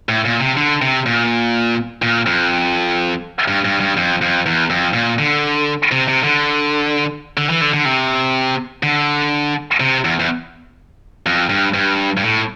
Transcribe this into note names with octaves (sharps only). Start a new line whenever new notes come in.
A2
A#2
C3
D3
C3
A#2
A#2
F2
G2
G2
G2
F2
F2
E2
F2
A#2
D3
C3
C3
D3
D3
E3
D3
D3
C3
D3
C3
E2
E2
F2
G2
G2
G2
A2